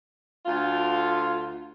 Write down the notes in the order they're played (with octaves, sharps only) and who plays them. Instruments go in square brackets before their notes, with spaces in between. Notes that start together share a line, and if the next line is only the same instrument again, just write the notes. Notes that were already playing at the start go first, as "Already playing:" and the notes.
[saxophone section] D2 F4